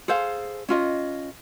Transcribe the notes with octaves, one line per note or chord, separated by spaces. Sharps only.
G#4 A4 C5 F5
C#4 F4 D#5